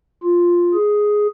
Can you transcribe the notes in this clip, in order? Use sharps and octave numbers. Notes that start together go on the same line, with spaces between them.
F4
G#4